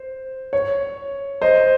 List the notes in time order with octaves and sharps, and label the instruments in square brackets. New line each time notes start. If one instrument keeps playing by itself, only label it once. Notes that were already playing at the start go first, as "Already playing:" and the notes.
Already playing: [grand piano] C5
C#5
C5 D#5